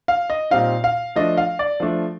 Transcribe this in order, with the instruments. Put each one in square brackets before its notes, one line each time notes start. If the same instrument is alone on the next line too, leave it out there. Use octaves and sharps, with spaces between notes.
[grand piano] F5
D#5
A#2 G3 C4 D#4 F5
F5
F3 A3 D4 D#5
F5
D5
F3 A3 D4